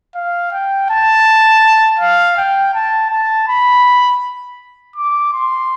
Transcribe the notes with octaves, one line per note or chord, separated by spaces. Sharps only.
F5
G5
A5
F5
G5
A5
A5
B5
D6
C6